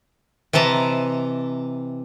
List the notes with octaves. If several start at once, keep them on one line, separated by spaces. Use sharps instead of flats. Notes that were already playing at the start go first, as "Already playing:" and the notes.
C3 E3 D#5 A5 A#5